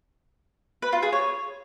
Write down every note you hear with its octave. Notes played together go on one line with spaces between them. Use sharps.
B4
F4
G#4
C#5